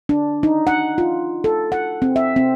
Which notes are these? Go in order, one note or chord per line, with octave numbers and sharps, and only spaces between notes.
D4
D#4
F#5
F4
A4
F#5
C4
E5
C4